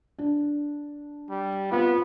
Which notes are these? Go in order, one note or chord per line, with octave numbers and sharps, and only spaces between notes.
D4
G3
B3 C4 F4